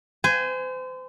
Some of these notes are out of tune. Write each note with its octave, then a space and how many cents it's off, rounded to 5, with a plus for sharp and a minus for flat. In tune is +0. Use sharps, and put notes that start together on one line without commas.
C5 -35 G#5 +0